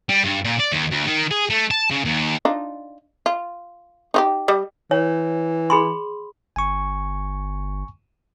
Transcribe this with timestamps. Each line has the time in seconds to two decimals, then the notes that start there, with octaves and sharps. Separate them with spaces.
0.09 G3
0.24 G2
0.44 A#2
0.59 D5
0.72 D#2
0.91 D2
1.06 D#3
1.31 G#4
1.50 A3
1.71 A5
1.91 C#3
2.05 D#2
2.45 D4 D#4 F4
3.26 F4
4.14 D#4 F4 G4
4.48 G3 D#5
4.91 E3 C#5
5.70 G#4 B5 C6
6.56 G1 G#5 C#6